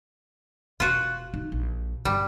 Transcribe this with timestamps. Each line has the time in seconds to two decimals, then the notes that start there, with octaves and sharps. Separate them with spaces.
0.80 E1 F4 F#4
1.34 D#4
1.52 A#1
2.05 G1 G3